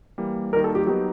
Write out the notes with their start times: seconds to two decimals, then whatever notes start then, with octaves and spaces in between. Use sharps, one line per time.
0.18 E3 G3 A#3
0.53 D#3 G3 A#3 A#4
0.64 A4
0.75 G4
0.87 F#3 B3 D#4 G4